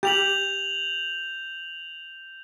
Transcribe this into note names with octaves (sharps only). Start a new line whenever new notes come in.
G4 G6 F7 F#7